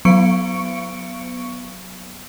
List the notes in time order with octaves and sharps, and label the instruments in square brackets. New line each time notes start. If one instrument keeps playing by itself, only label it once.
[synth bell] F#3 B3 C#6 C#7 D7